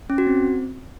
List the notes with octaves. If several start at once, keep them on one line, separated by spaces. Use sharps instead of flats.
C#4
F#4
C4